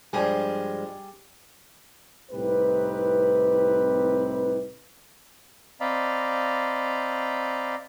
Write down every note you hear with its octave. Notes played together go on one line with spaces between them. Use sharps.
G2 F3 G3 G#3 G#4
C2 A2 C4 D#4 G4 B4
C4 D5 D#5 F5 A#5 B5